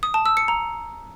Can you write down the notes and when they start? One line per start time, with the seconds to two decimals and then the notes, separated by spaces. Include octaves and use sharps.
0.03 D#6
0.14 A5
0.26 E6
0.37 C#7
0.48 A#5